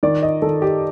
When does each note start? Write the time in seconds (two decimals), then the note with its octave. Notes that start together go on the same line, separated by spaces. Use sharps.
0.03 D#3 D5
0.23 D#5
0.42 D#3 A4
0.62 G4